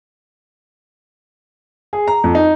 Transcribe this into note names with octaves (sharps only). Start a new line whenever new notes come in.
G#4
A#5
F2
D#4